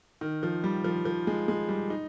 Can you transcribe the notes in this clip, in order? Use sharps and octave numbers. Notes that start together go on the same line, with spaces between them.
D#3
F3
G3
F3
F3
G#3
G#3
G3
D#4